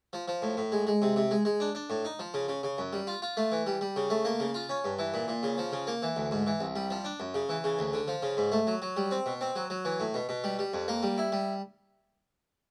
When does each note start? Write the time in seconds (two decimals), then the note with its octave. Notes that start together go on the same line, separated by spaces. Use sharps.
0.13 F3
0.28 F3
0.42 A2
0.57 A2
0.72 G#3
0.87 G#3
1.02 C3
1.16 C3
1.31 G#3
1.45 G#3
1.60 D4
1.75 D4
1.90 A2
2.05 D#4
2.19 F3
2.34 C#3
2.48 C#3
2.63 C#3
2.78 F#2
2.93 G3
3.07 F4
3.22 F4
3.37 A3
3.52 E3
3.67 G3
3.81 G3
3.96 C#3
4.10 A3
4.25 A#3
4.40 C#3
4.54 F4
4.69 C#4
4.84 G2
4.99 E3
5.14 A#2
5.28 A#2
5.43 C#3
5.58 F3
5.72 C#3
5.87 A#3
6.03 E3
6.16 D2
6.31 G#2
6.47 E3
6.60 C2
6.76 G3
6.90 F3
7.05 D4
7.20 F#2
7.34 C#3
7.49 E3
7.64 C#3
7.79 D2
7.93 D3
8.08 F3
8.23 C#3
8.37 G#2
8.52 A3
8.67 F#3
8.82 F#3
8.97 G3
9.11 C4
9.26 B2
9.41 C4
9.56 F#3
9.70 F#3
9.85 E3
10.00 A2
10.14 B2
10.29 B2
10.44 G3
10.59 G3
10.73 F2
10.88 A#3
11.03 G3
11.18 E4
11.32 G3